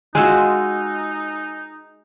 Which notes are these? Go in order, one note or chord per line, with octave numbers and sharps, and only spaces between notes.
G#3 D#4 F4 F#4 G#5 E6 F#6